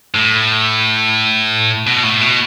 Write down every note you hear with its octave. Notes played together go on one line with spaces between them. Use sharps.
A2
B2
A2
B2